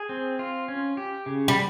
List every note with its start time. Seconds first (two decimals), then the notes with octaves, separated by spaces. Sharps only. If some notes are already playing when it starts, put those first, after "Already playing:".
Already playing: G#4
0.09 C4
0.39 F4
0.68 C#4
0.97 G4
1.26 C#3
1.48 G3